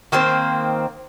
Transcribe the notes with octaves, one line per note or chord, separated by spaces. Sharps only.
D#3 A#3 C4 C5